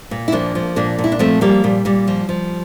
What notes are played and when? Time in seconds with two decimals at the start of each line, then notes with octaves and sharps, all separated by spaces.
0.11 A#2
0.28 E4
0.32 F3 A#3 D4
0.55 F3
0.76 A#2 A#3 D4
0.98 A#2
1.04 E4
1.12 D4
1.19 F3 A3 C4
1.41 F3 G3 A#3
1.64 A#2 G3
1.85 A#2 G3
2.08 F3
2.29 F3